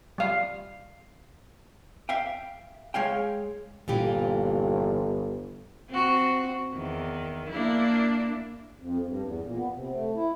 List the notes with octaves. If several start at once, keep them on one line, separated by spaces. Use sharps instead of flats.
G3 F5
E5 F5 G5
G#3 C#5 F5 G5
G1 A#2 E3 G4
C4 F#4
E2 D#3
A#3 D4 E4
F2
G2
E2
A#2
B3
C3
A3
E4